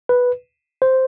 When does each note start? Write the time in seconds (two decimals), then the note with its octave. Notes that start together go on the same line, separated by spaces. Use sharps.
0.09 B4
0.82 C5